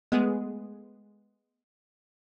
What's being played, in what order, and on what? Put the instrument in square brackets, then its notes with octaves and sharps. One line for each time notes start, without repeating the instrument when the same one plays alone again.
[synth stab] G#3 A3 B3 G#4